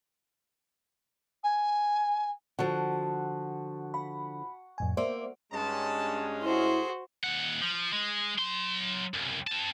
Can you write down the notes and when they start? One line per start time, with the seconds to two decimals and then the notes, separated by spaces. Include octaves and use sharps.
1.43 G#5
2.59 D3 F3 F#4 F#5 A5
3.94 F#5 B5
4.78 F2 A2 G#5
4.97 A#3 C5 D5 E5
5.53 G2 G#3 C#4 D#4 F#4 A5
6.43 E4 F#4 G#4 A4 C5
7.24 D#2 F#5
7.62 F3
7.93 G#3
8.39 F#3 C6
9.14 C2 F#2
9.47 C4 A5